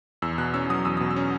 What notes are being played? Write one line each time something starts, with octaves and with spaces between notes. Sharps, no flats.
E2 E6
B2 F#6
C#4 E6
F#3 D#6
E2 E6
B2 D#6
E6
C#4